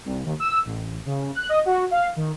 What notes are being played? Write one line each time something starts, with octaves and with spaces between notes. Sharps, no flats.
C2
D#2
E6
A1
C#3
F#6
D#5
F#4
F5
D#3